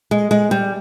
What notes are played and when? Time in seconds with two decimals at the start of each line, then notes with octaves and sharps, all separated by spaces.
0.11 G#3
0.31 G#3
0.51 G3